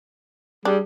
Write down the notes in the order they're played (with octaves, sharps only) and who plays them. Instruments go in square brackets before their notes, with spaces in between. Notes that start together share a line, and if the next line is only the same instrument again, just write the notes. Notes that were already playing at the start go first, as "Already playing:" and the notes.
[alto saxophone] G3 [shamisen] D4 [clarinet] G#4